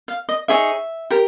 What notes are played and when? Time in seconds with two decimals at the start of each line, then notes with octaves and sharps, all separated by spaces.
0.08 F5
0.29 D#5
0.48 D#4 G#4 C#5 E5
1.10 G4 A#4